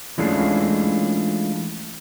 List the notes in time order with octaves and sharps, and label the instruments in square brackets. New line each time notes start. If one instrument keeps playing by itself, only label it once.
[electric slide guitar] E3 G#3 A3 C#4 D4 F4